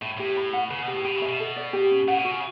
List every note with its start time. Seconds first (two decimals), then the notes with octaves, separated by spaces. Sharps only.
0.02 A2 E5
0.18 A2 G4
0.37 B5
0.53 F#5
0.70 C#3 B4
0.83 B2 G4
0.94 A2
1.04 B2 G4
1.17 C#3
1.22 E5
1.27 B2
1.40 A4
1.56 D5
1.73 G4
1.91 C#4
2.08 A2 F#5
2.19 B2
2.25 F#4
2.31 C#3